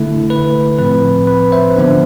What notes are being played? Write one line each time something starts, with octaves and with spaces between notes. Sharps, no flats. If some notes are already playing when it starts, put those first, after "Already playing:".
Already playing: D3 A3 E4
B4
A2 F3 C4 B4
B4
C5 E5
D3 F3 B3 D4